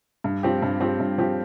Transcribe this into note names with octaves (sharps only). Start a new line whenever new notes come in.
G2
F3 C4 G4
G2
F3 C4 G4
G2
F3 C4 G4